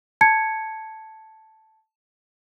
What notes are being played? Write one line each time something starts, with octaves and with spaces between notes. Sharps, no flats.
A5 G#6 C#7